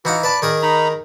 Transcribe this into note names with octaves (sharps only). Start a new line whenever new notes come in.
E3 D#4 F#4 F5 F#5
B4 D5 A5 B5
D#3 G#4 A#4
D#4 A#5 B5